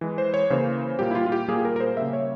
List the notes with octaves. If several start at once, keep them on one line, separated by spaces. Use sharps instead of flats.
E3 G#3
C5
C#5
C#3 E3 A#3 C5
A#2 G3 A#3 G4
E4
F4
F4
G4
A#2 G3 A#3 G#4
G#4
A#4
A#4
C5
C#3 G3 A#3 E5
C#5